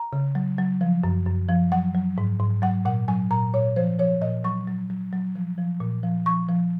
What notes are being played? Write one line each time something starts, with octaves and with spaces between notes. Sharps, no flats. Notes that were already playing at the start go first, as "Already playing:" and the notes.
Already playing: A#5
C#3
F#3
F#3
F3
F#2
F#2
F3
F#3 F#5
F#3
G#2
G#2
F#3 F#5
A#2 F#5
F#3 G#5
A#2 A#5
A#2 C#5
F3 C5
F3 C#5
A#2 D#5
F#3 C#6
F#3
F#3
F#3
F3
F3
A#2
F3
F3 C#6
F3